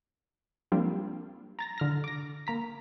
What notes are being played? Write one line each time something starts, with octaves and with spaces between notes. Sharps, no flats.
F3 G3 A#3 C4 D4
A#5 A6 A#6
D3 F6 A#6
D6 A#6
A#3 A#5 B6